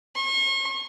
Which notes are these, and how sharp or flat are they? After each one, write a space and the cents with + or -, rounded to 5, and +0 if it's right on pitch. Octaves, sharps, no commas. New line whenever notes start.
C#6 -40